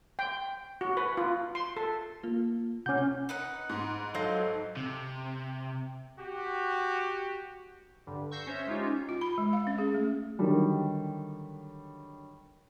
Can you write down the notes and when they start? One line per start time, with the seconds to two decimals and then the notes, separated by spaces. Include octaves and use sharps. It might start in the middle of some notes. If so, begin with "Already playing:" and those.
0.19 G5
0.81 F#4
0.97 B4
1.17 F4
1.55 C6
1.77 A4
2.24 A#3 F4
2.86 C3 C#4 F#5 D6 F6 G6
3.29 D#4 B4 F#5
3.70 G#2
4.15 F#3 F4 A4 C5 D#5
4.77 C3
6.19 F#4 G4
8.07 G2 D3
8.31 C#6 E6 G6 A#6 C7
8.47 C#4 C5 C#5 E5
8.67 G#3 C#4 D#4 F4 G4
9.09 F4
9.21 B5
9.38 G#3
9.53 F5
9.67 C#4
9.78 G#4
9.94 A3
10.39 D3 D#3 F#3 G3